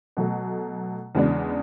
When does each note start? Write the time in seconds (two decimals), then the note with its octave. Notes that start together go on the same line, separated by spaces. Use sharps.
0.17 B2 F#3 A3
1.15 E2 C#3 G#3 B3 D4